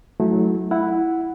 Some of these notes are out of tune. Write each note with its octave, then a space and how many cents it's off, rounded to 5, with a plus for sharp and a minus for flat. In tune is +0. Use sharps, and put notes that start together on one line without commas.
F#3 +0 A3 -20 E4 -30
E4 +0 F#5 +0